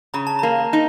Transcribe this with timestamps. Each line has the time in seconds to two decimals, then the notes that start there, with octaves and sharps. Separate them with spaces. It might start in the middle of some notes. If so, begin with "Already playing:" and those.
0.14 C#3 A#5
0.27 A5
0.39 A#3 A#5
0.73 D#4